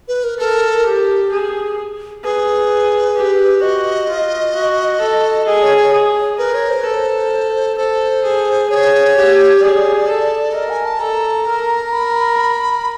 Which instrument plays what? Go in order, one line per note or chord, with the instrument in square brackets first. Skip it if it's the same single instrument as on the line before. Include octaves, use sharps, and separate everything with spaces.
[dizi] B4
A#4
[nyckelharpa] A4 [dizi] A#4
[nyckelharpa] G4
G#4
[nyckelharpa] G#4 [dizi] B4
[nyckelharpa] G4
[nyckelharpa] F#4 [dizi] D#5
[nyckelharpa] F4
F#4
A4
[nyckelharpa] G#4 [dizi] D#5
[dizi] C#5
C#5
[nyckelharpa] G#4
[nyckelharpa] A#4 [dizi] B4
[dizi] C#5
C5
[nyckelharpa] A4 [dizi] B4
[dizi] C5
[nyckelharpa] A4 [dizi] C5
[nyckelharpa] G#4
[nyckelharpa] G#4 [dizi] C#5
[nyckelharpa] G4
[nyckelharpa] G#4 [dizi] D5
[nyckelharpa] A4
[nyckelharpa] A#4 [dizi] D#5
[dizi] G#5
A5
[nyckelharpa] A4 [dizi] A#5
[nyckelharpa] A#4
[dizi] B5